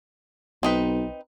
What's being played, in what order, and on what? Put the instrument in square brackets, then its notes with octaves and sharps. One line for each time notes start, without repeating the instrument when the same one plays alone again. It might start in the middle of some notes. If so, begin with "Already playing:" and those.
[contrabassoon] B1 [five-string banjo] C4 D#4 B4